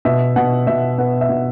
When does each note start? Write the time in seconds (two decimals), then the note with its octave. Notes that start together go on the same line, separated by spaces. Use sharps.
0.05 B2 E5
0.36 B2 F#5
0.67 B2 E5
0.98 B3 F#5
1.21 E5
1.29 B2